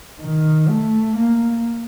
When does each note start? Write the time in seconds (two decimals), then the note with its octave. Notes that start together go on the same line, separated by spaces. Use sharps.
0.21 D#3
0.69 A3
1.17 A#3